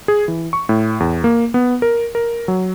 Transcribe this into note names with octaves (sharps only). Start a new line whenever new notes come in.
G#4
E3
C#6
A2
E2
A#3
B3
A#4
A#4
F#3